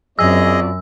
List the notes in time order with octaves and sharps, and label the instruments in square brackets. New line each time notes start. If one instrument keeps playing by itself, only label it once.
[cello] F#2 [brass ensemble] C4 F4 D5 [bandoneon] G#4 D#5 [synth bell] E6